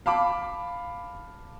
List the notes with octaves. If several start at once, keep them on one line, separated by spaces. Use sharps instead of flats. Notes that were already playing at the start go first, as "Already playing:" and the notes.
F5 A5 B5 D6